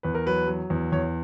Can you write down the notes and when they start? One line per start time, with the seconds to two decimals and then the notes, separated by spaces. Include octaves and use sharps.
0.03 E2 B4
0.15 A#4
0.26 F#3 B4
0.47 F#3
0.70 E2
0.92 E2 C#5